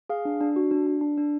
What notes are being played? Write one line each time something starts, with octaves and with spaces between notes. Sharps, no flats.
G#4 F5
D4
D4
F#4
D4
D4
D4
D4